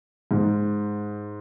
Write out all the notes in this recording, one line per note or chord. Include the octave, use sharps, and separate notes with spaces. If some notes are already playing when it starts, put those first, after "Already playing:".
G#2